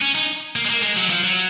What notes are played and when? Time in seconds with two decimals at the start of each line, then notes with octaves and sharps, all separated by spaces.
0.01 C#4
0.15 D#4
0.56 A#3
0.65 G#3
0.70 A#3
0.83 G#3
0.97 F#3
1.10 F3
1.24 F#3